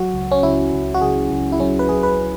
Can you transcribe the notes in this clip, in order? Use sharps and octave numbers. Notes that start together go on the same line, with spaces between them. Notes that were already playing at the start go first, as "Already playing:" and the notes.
Already playing: F#3 F#4
C#2
C#4
C#2 E4
C#2
F#4
C#2 G#4
C#2
E4
F#3 C#4
B4
F#3 G#4
B4